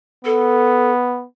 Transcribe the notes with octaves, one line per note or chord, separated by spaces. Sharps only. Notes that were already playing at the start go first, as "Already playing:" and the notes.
B3 A4